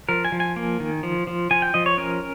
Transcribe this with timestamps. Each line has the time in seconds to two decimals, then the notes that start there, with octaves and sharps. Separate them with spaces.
0.09 F3 A#4
0.25 G#5
0.32 F3
0.40 G#5
0.56 A#3
0.80 D#3
1.03 F3
1.27 F3
1.51 F3 G#5
1.62 G5
1.74 F3 D#5
1.86 C#5
1.98 C#4 A#4